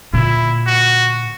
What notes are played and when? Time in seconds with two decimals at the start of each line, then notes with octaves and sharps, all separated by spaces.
0.14 A#2 D3 E4
0.66 F#4